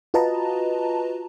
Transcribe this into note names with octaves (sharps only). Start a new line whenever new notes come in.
F4 F#4 B4 D#5 A5 A#5